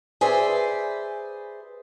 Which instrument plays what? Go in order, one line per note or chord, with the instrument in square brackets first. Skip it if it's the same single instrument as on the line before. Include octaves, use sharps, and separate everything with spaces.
[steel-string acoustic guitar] G#4 B4 C5 D5 E5